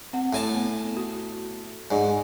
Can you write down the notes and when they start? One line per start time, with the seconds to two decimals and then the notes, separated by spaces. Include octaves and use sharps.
0.13 C4 F#5
0.33 A2 G#5 A5
0.54 B3
0.97 F#4
1.91 G#2 D#4 D5